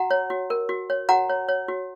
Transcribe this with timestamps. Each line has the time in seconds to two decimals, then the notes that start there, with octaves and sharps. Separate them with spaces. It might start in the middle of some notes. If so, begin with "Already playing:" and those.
Already playing: F#4 F#5 A#5
0.11 C#5
0.30 F#4
0.50 A#4
0.69 F#4
0.90 C#5
1.09 F#4 F#5 A#5
1.29 C#5
1.49 C#5
1.68 F#4